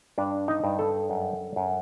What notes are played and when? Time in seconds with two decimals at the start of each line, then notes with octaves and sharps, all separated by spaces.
0.18 G2 D4
0.48 D#4
0.64 G2
0.79 A4
1.10 F#2
1.56 F#2